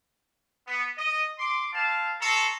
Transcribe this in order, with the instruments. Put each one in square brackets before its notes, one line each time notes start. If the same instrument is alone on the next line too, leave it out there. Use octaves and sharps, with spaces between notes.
[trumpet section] B3
D#5
C6 D6
C4 F5 A5
A4 A#5 C6 C#6